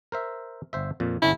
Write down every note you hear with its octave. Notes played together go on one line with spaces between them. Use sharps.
A#4 C5 E5
G1 C5 E5
F2 A#2
G1 D3 C#4 E4